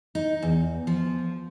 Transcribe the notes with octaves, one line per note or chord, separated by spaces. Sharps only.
D#4
E2
F3